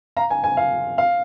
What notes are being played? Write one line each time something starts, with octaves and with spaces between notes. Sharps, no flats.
F5 A#5
G#5
G#5
F5
F5